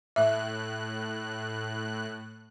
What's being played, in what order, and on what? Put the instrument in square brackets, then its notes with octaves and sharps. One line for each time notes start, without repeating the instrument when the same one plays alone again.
[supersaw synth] A2 F#6 [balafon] E5